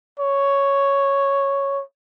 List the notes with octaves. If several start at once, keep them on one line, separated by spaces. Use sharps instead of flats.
C#5